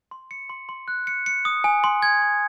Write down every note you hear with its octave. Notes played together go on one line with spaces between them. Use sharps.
C6
C#7
C6
C6
F#6
C#7
C#7
D#6
G#5
C6
G#6
C6